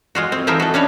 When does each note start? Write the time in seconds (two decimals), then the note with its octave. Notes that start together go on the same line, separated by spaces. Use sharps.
0.15 G#3 F4 F#4
0.32 C4
0.47 E3 F3 D#4 F4 E5 G5
0.60 F#4 A4
0.74 C#4 D4 B4 C#5